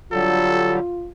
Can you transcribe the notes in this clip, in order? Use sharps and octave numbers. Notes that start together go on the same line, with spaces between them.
D3 F#3 G3 F4 A4